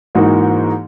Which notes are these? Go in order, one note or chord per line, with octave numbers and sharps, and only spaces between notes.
G#2 E3 A#3 D#4 F#4